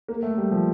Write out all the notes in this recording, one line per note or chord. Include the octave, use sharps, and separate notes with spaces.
A#3
A3
G3
F3